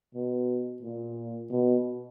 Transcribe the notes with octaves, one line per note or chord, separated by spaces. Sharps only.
B2
A#2
B2